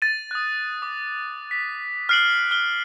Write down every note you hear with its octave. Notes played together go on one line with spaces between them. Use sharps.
A6 D#7
D#6 F#6
D6
B6
F6 F#6 C7 D7 F#7
F6 G7